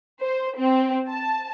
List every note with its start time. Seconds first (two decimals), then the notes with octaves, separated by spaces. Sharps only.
0.23 C5
0.58 C4
1.09 A5